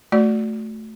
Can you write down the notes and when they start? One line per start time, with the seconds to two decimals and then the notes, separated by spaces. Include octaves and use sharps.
0.12 A3 F#4 D5